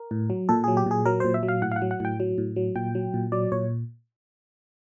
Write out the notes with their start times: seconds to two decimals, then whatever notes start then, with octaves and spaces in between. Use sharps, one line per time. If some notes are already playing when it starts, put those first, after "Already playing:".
Already playing: A#4
0.11 A2
0.30 F#3
0.49 A#2 A4
0.64 F#3 G#4
0.77 G4
0.86 A#2 G#4
1.05 F#3 A#4
1.20 A#2 C5
1.34 E5
1.43 F#3
1.48 F5
1.62 A2 F#5
1.71 F5
1.76 F#5
1.82 F#3
1.91 F#5
2.00 A2 G5
2.20 F#3
2.38 A2
2.56 F#3
2.76 A#2 G5
2.95 F#3
3.14 A#2
3.32 F#3 D5
3.52 A#2 C#5